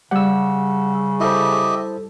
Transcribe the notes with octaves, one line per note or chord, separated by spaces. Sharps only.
C#3 G3 F#5 E6
E4 G4 A4 C5 D#5 E5